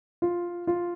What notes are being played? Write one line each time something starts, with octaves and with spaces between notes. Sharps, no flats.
F4
F4